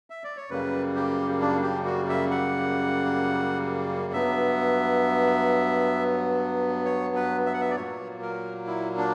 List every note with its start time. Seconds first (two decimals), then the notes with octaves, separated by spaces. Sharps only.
0.10 E5
0.24 D5
0.37 C#5
0.50 F#2 C#3 G3 A#3 B4
0.96 G4
1.41 D4
1.63 G4
1.86 F#4
2.09 E5
2.31 F#5
4.13 G2 F#3 B3 E5
6.85 C#5
7.16 B4
7.46 E5
7.54 F#5
7.61 E5
7.70 D5
7.76 A#2 F#3 A#3 C#5
8.22 A#4
8.67 E4
8.97 D4